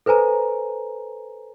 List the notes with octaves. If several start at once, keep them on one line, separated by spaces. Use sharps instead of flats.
A4 B4 C5 G#5 A#5